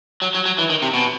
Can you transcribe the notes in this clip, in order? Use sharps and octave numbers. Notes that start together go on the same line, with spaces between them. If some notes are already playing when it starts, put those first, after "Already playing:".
F#3
F#3
F#3
E3
D#3
C3
B2